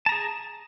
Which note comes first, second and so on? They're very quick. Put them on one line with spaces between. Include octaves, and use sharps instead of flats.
A5 A#5 G#4